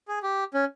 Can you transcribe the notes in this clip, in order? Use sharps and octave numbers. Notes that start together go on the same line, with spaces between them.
G#4
G4
C#4